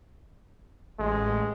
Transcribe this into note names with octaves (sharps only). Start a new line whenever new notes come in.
A1 G#3